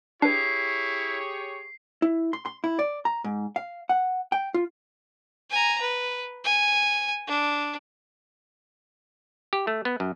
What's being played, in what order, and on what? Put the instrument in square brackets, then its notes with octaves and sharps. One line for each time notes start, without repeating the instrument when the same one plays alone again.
[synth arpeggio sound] D4 B4 [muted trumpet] E4 [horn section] G4 G#4 C#5 [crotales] C7
[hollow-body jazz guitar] E4
C6
C6
E4
D5
A#5
G#2
F5
F#5
G5
F4
[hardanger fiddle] G#5 A#5
B4
G#5
D4
[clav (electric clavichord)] G4
A3
B3
F#2